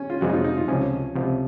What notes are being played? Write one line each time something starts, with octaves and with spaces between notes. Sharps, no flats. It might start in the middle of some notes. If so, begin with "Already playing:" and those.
Already playing: C#4
F4
F2 C3 F3 G#3 F#4
D#4
F4
D#4
F4
C#2 C3 F3 C#4
C#2 C3 F3